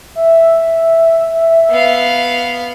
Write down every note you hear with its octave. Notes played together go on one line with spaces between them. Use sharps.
E5
B3 F5